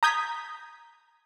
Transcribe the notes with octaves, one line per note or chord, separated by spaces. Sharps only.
A#5 D#6 G6 G#6 B6